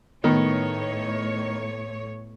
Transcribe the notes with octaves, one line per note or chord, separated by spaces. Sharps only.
A2 D#3 B3 C#5